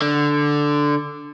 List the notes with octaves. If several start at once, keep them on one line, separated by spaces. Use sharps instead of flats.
D3